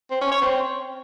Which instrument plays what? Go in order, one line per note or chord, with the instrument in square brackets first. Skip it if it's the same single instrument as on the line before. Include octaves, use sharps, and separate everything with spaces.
[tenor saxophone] C4
C#4
C#5
C4